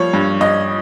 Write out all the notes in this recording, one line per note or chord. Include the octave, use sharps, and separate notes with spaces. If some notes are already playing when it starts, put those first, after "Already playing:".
Already playing: F3 G3 A#3 C#5
G2
G2 D#5